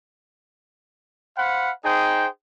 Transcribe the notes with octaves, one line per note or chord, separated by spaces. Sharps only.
C5 F5 F#5 B5
D#4 G#4 C5 G5